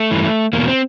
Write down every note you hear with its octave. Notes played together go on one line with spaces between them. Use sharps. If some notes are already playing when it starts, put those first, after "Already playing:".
Already playing: A3
G2 E3
E2 B2 A#3
C4